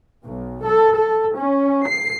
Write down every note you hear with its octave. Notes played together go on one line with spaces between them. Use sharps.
B1
A4
A4
C#4
C7